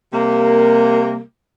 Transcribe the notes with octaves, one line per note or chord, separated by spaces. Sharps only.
C3 G3 A#3